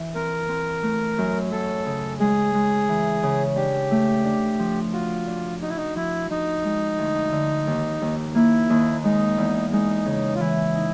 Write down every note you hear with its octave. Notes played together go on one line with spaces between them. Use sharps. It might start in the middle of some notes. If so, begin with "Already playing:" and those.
Already playing: E3
C4 A#4
C4
A3
F#2
F#3 A4
C#3
G#3 G#4
G#3
E3
C#3
D4 G4
A3
D4
F3
F4 F#4
D4
D#4 F#4
E4
D#4
F3 E4
F3 D#4
G#3
D2
D3
D#2
D#2
A#3 E4
D#2
G#3 D#4
E2
G#3 D#4
C#3
F4
E3 E4
D#4